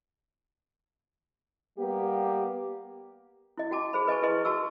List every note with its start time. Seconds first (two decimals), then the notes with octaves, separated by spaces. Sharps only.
1.78 G3 A#3 B3 G4
3.58 E4 D#5
3.71 F#4 G5 A5 D6
3.93 G#4 C5 B5
4.07 B4 D#5 G#5 A5 C#6
4.23 E4 G#4 B4 D#5 C6
4.45 F#4 A5 C#6 E6